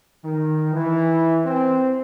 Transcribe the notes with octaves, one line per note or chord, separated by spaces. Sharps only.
D#3
E3
C4